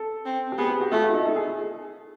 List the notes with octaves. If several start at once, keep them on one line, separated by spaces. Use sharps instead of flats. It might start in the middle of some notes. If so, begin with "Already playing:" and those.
Already playing: A4
C4
G4
B3 G#4
G4
F#4
A3 F4
F4
E4
D#4
A4
G#4